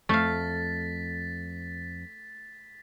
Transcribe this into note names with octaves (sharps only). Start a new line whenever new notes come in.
F2 A3 F5 A6 B6